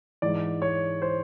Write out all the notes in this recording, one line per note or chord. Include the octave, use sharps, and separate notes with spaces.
G#2 E3 D5
C#5
C5